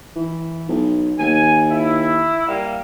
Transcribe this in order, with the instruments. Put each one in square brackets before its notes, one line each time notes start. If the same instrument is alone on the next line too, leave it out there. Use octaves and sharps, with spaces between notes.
[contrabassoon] E3
B1
[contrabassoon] D#2 [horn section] G#5
[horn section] E4
G3 A#3